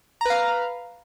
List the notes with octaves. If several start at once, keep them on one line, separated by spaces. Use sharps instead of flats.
B4 F5 A#5